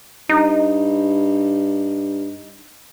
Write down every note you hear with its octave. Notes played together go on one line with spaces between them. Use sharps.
G2 D#4